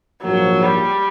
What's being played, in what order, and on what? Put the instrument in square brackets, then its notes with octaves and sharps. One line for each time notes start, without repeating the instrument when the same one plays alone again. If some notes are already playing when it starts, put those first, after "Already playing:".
[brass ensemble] A#1 G#2 F3 A#3 [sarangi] F#3
[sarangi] G3